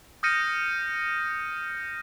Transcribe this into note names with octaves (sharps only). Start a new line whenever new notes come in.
D#6 F6 G6 A#6 C#7 D#7